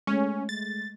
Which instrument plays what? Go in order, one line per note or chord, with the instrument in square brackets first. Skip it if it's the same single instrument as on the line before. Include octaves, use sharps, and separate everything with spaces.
[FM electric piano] G#3 A3 [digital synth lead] C#4
[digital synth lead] A6